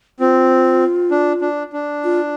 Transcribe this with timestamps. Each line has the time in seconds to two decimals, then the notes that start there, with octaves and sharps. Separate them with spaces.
0.20 C4 F4
1.11 D4
1.42 D4
1.73 D4
2.04 F4